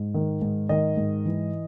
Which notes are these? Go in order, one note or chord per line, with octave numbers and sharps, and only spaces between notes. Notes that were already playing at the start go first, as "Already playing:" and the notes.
Already playing: G#2
D#3
G#2
D#3 D#5
G#2
E3